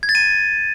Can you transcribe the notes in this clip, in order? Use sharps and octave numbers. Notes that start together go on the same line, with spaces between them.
G#6
A6
D#7